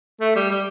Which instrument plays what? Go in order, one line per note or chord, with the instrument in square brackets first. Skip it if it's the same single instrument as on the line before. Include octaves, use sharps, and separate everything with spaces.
[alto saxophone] A3
G3
G3